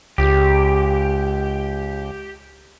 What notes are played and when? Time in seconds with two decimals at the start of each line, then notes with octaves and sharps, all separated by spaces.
0.18 C#2 G4